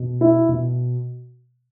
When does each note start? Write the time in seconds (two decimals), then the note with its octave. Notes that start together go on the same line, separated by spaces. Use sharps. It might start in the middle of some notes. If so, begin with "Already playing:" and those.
Already playing: B2
0.21 E4
0.49 B2